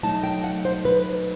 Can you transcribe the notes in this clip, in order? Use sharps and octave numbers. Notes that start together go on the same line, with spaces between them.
F#3 A3 D#4 A5
G5
F#5
C5
B4